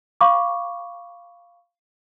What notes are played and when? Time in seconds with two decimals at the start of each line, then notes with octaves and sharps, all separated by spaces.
0.21 F5 B5 C#6 D6